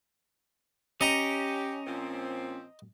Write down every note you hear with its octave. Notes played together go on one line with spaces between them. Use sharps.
C#4 G4 D#5 A#5
A#2 F3 C4